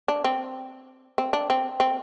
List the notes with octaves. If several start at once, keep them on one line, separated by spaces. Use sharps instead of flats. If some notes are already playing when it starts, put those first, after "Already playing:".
D4
C4
C4
D4
C4
C4